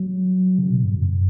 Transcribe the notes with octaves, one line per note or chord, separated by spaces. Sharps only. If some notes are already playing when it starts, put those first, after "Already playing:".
Already playing: F#3
C#3
B2
G2
F#2